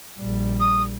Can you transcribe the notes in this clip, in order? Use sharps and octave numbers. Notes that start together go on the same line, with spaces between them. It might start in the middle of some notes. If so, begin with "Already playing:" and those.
A#1 G3
D#6